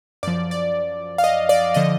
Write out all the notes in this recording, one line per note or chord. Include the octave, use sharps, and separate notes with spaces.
F#2 F3 D5
D5
F5
D#5
D5
D3 F3 D#5